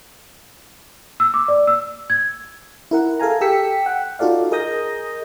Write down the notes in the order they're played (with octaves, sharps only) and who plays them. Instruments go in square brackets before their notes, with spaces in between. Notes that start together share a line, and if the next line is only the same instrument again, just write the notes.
[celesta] E6
D6
D5
E6
G#6
[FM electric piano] E4 A#4 F#5
G#4 A4 F5 G#5 A#5
G4 A4 G5 E6 B6 C#7
F#5 G5
D#4 F4 F#4 A4 D5 F5
G#4 A#4 D#5 D#6 G6 A#6